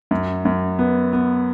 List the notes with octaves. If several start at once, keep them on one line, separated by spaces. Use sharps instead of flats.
F#2
F#2
B3
B3